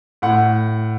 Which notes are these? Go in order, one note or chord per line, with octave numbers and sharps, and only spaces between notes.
A2 F#5